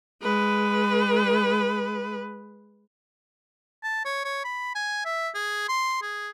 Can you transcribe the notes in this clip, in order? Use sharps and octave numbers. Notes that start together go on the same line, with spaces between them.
G#3 B4
A5
C#5
C#5
B5
G#5
E5
G#4
C6
G#4